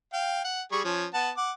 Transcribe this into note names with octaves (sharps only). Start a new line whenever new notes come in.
F5 G5
F#5
G3 G#4 C#6
F3 C#4
B3 F#5 A5
F#5 D6